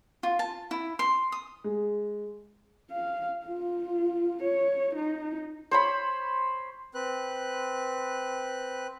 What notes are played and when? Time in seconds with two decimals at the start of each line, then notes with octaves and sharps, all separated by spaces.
0.23 F4
0.39 A5
0.71 E4
0.99 C6
1.32 D#6
1.64 G#3
2.91 F5
3.46 F4
4.43 C#5
4.95 D#4
5.71 C5 C#5 B5
6.95 C4 B4 F#6